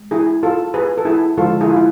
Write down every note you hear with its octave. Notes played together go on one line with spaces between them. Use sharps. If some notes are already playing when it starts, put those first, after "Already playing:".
Already playing: G#3
E4 G#4
F4 A4
G#4 B4
A4
E4 G#4
D3 F3 G#3 F4 A4
E4 G#4
F4
E4